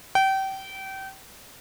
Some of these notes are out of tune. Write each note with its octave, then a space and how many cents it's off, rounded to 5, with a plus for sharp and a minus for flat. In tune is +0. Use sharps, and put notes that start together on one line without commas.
G5 -30